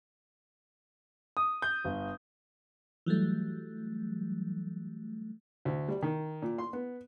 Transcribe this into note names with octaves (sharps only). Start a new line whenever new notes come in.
D#6
G6
G1
E3 F#3 G3 A3
D2
G3
D#3
A#2
C6
B3